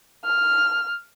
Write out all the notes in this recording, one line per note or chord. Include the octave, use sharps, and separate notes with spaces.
F6